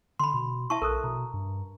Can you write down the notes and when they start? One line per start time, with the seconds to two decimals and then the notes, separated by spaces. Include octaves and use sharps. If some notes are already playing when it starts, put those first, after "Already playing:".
0.19 D3 B5 C6
0.34 B2
0.70 E4 E5 A5 C#6
0.82 A#1 A4 A#4 D#6 F#6
1.04 B2 A#5
1.34 G2